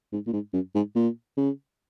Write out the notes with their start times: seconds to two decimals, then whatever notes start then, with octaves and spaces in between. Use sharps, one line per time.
0.12 G#2
0.27 A#2
0.33 G#2
0.53 F#2
0.75 G#2
0.95 A#2
1.37 C#3